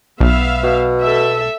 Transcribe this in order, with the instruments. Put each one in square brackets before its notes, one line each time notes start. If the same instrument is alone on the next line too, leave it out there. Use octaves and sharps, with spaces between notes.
[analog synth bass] B1 [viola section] B3 E5 F5
[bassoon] B2
[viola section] A4 E5